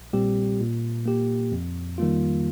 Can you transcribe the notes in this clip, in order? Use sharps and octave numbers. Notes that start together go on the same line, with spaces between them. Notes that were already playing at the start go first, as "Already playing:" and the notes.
Already playing: A#1
A#2 G3 C4 G4
A#2
A#3 G4
F2
D#3 G3 A#3 F4